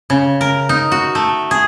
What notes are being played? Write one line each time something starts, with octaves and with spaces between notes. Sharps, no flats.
C#3
A#4
D#4
F#4
A3
G#4